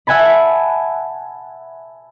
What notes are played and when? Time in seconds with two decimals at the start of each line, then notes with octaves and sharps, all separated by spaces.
0.07 E5 F#5 G#5 A5 B5